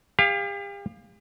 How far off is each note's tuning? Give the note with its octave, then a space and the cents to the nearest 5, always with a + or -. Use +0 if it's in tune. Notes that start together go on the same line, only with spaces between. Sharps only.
G4 +40 F5 +0